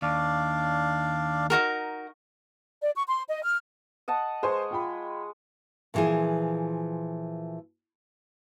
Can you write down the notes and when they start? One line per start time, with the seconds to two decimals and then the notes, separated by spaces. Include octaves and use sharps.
0.02 D#2 D4 D5 F5
1.50 D#4 F#4 A#4
2.81 D5
2.95 C#6
3.06 C6
3.28 D#5
3.44 F6
4.08 D#5 F#5 A5
4.42 G#3 B4 C5 G#5 C#6
4.71 F4 G5 B5
5.94 A#2 D3 E3 F3 G#4